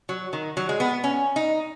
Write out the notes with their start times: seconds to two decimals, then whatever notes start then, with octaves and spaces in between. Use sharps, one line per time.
0.09 F#3
0.33 D#3
0.57 F#3
0.69 G#3
0.80 B3
1.04 C#4
1.36 D#4